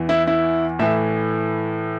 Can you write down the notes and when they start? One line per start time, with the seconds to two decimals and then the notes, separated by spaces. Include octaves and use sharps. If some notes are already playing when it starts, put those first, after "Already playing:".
Already playing: E2 E3
0.09 E4
0.27 E4
0.79 A2 E3 E5